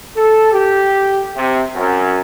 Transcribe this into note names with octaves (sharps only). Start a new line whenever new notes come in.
A4
G4
C3
F#2